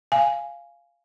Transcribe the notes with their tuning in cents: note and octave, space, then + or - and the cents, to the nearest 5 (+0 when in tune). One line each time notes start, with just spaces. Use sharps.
F5 -10 G#5 +0